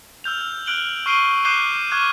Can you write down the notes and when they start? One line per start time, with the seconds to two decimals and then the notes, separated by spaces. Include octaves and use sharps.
0.24 E6 F6 G6 F7
0.66 F6 F#6 D7 F#7 G7
1.06 C#6 F6 C7 D7 D#7 G7
1.45 D6 F#6 G6 C7 D#7 G7
1.91 C#6 D6 F6 F#6 G#6 D#7